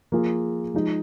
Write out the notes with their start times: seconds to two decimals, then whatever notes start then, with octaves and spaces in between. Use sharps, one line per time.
0.12 F3 A#3 F4 G#4
0.74 F3 G#3 D#4